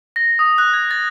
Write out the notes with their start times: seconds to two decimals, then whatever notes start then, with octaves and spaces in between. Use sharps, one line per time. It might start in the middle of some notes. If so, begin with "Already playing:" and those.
0.16 A#6
0.39 D#6
0.58 F#6
0.73 G#6
0.91 A6